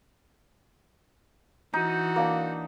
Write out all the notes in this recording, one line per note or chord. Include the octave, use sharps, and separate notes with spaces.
E3 D#4 F#4
A#3 D4